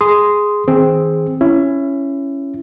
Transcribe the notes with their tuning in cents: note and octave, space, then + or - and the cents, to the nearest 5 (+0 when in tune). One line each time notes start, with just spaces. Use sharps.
G#4 +0 C6 -10 D#6 +0
D#3 +45 C4 +0 G#4 -5
C#4 +0 E4 +20